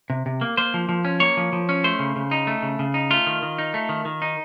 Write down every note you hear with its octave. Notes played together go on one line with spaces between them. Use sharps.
C3
C3
A#3
A#3 C5
F3
F3
C#4
A#3 C#5
F3
F3
C#4
A3 C5
C#3
C#3
D#4
A3
C#3
C#3
D#4
A3 F4
D#3
D#3
D#4
A3
D#3
D#3
D#4